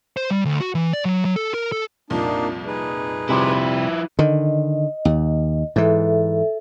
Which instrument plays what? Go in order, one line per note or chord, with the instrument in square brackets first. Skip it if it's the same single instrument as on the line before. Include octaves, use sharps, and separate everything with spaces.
[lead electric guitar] C5
G3
D2
F#4
E3
D5
F#3
F#3
A4
A#4
A4
[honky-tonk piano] C2 F2 A#2 [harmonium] A#3 D4 D#4
[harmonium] D#4 G#4 B4
[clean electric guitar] C3 G3 [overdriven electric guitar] F3 E4
[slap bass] D3 D#3 [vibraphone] D#5
[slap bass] D#2
[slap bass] G#2 E3 [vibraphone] A4 E5